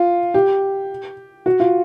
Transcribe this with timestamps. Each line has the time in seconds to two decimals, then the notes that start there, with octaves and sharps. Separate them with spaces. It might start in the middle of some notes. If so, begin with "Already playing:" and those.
Already playing: F4
0.34 G4
1.46 F#4
1.60 F4